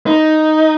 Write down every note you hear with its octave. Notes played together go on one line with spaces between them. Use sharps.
D#4